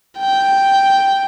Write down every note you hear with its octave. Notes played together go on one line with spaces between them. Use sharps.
G5